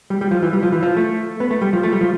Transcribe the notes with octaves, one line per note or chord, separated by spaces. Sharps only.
G3
G3
F3
E3
G3
F3
E3
F3
A3
B3
A3
G3
F3
A3
G3
F3